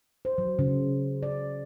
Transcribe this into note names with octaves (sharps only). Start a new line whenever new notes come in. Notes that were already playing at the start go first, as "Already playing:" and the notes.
C5
F#3
C#3
D5